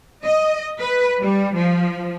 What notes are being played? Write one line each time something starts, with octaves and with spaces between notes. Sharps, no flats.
D#5
B4
G3
F3